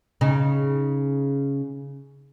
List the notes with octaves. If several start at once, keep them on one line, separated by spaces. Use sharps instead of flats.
C#3 D#4